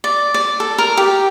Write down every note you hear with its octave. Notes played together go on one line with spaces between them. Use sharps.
D5
D5
A4
A#4
G4